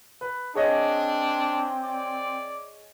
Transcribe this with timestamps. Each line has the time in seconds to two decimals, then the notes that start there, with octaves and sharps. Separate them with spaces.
0.21 B4
0.55 C4 D4 G#4 C#5 D#5
1.83 D5